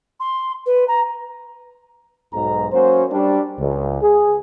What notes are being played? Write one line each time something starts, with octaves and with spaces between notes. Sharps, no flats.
C6
B4
A#5
B1 G#2 A#5
F#3 A#3 C#4 F#4 C5
G3 D4
C#2
G#4